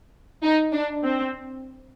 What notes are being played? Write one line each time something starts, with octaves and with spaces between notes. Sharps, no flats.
D#4
D4
C4